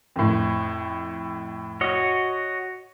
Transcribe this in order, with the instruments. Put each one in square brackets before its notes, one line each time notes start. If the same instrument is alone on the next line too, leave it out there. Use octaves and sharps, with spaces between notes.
[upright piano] F2 A2
[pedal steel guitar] F#4 C#5 D#5